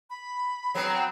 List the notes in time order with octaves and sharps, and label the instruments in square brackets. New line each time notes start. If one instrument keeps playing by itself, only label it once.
[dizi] B5
[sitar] F#3 B3 C4
[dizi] G5